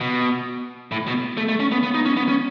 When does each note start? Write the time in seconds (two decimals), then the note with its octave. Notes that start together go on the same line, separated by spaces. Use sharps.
0.01 B2
0.92 A2
1.07 B2
1.37 A3
1.49 A3
1.60 C#4
1.72 B3
1.83 B3
1.94 D#4
2.05 C#4
2.17 B3
2.29 C#4